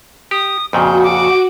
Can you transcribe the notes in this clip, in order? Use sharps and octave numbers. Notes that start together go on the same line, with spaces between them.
G4 D#6
F2 A#2 C#3 F#4 G6
D6